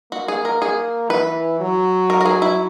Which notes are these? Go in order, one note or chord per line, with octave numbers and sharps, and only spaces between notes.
A#3 F#4
G#4
A#4
G#4
E3 B4
F#3
A#4
A#4
G#4
E4